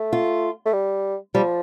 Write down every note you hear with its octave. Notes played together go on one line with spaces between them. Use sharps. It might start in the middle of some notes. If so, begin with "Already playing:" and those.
Already playing: A3
F4
A3
G3
F3 G3